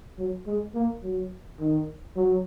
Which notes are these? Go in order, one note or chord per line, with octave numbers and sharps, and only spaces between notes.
F#3
G#3
A#3
F#3
D#3
F#3